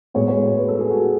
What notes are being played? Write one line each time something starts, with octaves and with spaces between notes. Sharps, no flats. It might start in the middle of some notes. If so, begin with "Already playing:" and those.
A2 G#3 B3 C#5
C#5
C#5
B4
A4
G#4
F#4
F4